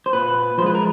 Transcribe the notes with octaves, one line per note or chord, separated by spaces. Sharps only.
C5
A#2 B4
F3 G#3 C5
B4
A#4